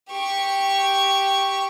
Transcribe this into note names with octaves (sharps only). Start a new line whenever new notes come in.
G4 C#6